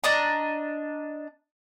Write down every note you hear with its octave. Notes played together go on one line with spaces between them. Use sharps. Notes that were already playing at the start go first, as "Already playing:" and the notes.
D4 D#5 A#5